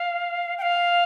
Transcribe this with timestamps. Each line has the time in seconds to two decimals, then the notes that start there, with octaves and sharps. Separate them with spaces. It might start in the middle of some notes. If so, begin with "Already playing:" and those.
Already playing: F5
0.58 G5
0.62 F5